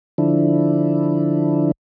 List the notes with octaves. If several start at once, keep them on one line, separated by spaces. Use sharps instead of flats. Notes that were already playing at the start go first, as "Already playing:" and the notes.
D3 F3 D4 E4